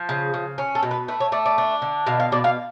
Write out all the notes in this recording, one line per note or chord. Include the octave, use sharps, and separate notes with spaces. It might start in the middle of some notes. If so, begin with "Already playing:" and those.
Already playing: F3
C#3
C#3
C#4
A4
B2
B4
A3 B4
C#5
A3 D5
D5
D4
D3
B2 F5
F5
B2 D5
F5